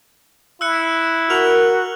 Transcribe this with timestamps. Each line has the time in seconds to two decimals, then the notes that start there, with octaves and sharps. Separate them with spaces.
0.61 E4 E6 F#6 C#7
1.30 F#4 A#4 F6 F7 F#7